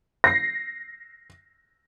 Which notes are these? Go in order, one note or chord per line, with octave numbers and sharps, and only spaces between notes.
A#6 C7